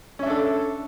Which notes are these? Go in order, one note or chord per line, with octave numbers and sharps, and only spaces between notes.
C#4 D4 A4 E5